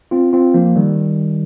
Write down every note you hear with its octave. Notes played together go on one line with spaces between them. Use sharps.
C4 F4
C4 F4
F3 A#3
D#3 G3